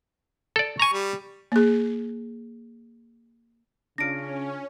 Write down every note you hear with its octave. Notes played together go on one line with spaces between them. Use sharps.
A4 D5
G#5 A#5 C#6
G3
A#3 G#4
C#3 C#4 D4 F4 A#6 D7